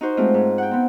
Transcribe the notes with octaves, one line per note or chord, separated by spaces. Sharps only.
D#4 F#4 C5
G#3 A3 C4 F4
G#2
F#5 G5
B3 C4